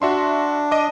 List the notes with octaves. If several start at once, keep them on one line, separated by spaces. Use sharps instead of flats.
D4 F#4 E5 C6
D#5 D6